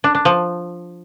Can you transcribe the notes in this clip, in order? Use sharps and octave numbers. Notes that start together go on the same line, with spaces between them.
D4
D4
F3